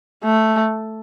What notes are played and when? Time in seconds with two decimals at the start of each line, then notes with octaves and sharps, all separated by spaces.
0.24 A3